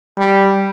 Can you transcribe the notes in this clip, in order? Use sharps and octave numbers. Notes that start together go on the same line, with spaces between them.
G3